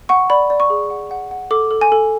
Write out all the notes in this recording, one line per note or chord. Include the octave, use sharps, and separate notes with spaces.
F#5 C#6
D5 B5
D5
C#6
G#4
F#5
F#5
F#5
A4 D6
A4
G#5
A4